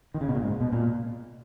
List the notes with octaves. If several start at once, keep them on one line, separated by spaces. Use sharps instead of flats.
D#3
C#3
B2
A#2
G#2
B2
A#2